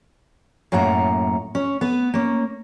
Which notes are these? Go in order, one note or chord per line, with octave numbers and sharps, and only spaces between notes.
F#2 A2 A#3 F#5 A#5
C#4
B3 B4
A#3 C#4